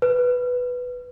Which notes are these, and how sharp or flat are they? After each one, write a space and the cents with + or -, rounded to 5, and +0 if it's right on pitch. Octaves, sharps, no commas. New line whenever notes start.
B4 +0